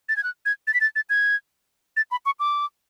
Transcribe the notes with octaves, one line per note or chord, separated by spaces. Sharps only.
A6
G#6
F#6
G#6
A6
B6
A6
A6
G#6
A6
B5
C#6
D6